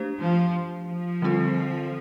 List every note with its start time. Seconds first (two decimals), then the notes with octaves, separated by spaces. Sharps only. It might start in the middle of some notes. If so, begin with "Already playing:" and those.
Already playing: A3 D4 G4 C5
0.19 F3
0.87 F3
1.22 D3 G3 C4 F4 A4